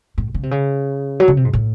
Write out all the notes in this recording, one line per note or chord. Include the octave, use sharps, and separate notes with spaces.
A2
C#3
C3
C#3
F#3
C#3
C3
G#2
A2